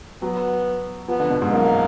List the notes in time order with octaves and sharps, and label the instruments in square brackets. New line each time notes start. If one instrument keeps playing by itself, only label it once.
[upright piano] F#3 [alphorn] B3
[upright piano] F3 [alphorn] B3
[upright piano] D3
B2
G#2
[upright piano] F#2 [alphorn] A#3